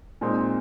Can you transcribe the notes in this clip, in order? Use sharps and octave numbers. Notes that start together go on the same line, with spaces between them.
A#2 G#3 C4 D#4